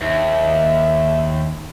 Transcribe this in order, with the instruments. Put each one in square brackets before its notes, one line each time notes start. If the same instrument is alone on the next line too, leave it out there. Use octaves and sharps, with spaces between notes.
[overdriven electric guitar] D#2 [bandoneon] E5